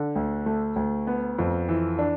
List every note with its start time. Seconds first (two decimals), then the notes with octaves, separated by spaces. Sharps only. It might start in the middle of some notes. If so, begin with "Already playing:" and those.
Already playing: D3
0.16 D2
0.46 A3
0.76 D2
1.07 B3
1.39 F2
1.68 E3
1.99 D4